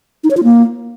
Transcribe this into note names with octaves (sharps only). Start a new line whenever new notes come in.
D#4
C#5
F4
A#3